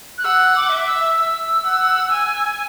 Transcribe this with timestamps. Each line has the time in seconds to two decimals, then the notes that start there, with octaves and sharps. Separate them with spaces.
0.18 F#6
0.24 F#5 E6
0.56 D6
0.71 E5
0.87 E6
1.19 E6
1.65 F#5
2.12 G#5